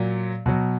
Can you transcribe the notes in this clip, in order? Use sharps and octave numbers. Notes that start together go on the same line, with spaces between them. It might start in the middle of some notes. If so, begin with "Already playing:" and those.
Already playing: A#2 F#3
B2 F#3